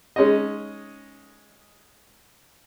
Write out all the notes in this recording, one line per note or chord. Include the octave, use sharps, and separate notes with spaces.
G#3 C#4 D#4 D#5